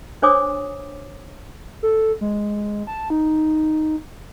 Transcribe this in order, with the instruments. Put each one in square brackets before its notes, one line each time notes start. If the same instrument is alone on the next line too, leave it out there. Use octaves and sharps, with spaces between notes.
[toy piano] D4 C5 C#5 G#5 D6 D#6
[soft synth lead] A4
G#3
A5
D#4